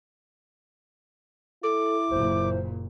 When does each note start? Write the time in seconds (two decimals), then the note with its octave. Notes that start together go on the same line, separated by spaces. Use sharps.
1.63 E4 A4 D6
2.11 F#1 F#2 A#2 C5